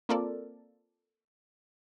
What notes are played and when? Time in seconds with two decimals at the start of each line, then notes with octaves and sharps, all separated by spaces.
0.09 A#3 C4 F4 A4 A#4 D5